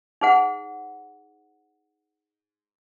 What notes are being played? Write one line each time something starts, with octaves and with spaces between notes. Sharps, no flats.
D#4 G#4 C5 F#5